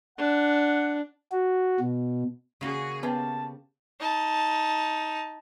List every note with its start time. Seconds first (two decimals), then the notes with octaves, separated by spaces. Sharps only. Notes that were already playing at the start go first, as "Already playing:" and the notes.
0.18 D4 F#5
1.32 F#4
1.80 B2
2.61 C#3 A#3 C#4 F#4 G#4
3.03 C#3 B3 C#4 G4 B4 F5 A5
4.00 D#4 A5